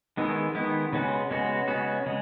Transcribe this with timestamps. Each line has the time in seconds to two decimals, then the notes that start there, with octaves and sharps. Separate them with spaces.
0.17 D#3 G#3 B3 E4
0.55 D#3 G#3 B3 E4
0.93 C#3 G#3 B3 F#4
1.31 C#3 G#3 B3 F#4
1.68 C#3 G#3 B3 F#4
2.06 C#3 G#3